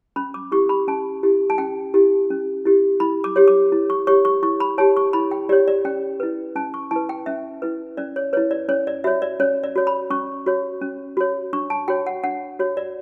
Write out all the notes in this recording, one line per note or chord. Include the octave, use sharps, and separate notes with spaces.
C#4 B5
D6
E4 G4 C#6
B5
C#4 A5
E4 G4
A5
C#4 G5
E4 G4
C#4
E4 G4
E4 B5
D6
G4 C#5
D6
E4
C#6
G4 C#5 C#6
C#6
E4 C#6
B5
G4 C#5 A5
C#6
E4 B5
G5
G4 C#5 D5
D5
C#4 G5
E4 B4
C#4 A5
C#6
E4 B4 A5
G5
C#4 E5
E4 B4
C#4 D5
C#5
E4 B4 C#5
D5
C#4 C#5
D5
F#4 C#5 E5
D5
C#4 C#5
D5
F#4 C#5
B5
C#4 C#6
F#4 C#5
C#4
F#4 C#5
D4 C#6
A5
F#4 C#5 G5
F#5
D4 F#5
F#4 C#5
D5